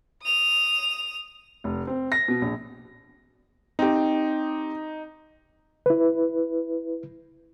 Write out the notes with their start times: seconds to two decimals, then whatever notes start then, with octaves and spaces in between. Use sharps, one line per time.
0.23 D#6 F7
1.64 F1
1.87 C4
2.12 A#6
2.28 B2
2.42 A#1
3.79 C4 D#4 G4
5.86 E4 B4